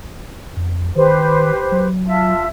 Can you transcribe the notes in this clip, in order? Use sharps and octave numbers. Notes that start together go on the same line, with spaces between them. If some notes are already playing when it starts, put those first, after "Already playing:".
F2
D#3 G4 B4 C5
F#3
F4 E5 A5